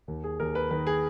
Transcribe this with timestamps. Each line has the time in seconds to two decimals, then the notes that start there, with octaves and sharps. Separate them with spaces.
0.08 D#2
0.24 G#4
0.40 D#2 A#4
0.55 B4
0.71 D#3 B4
0.87 G#4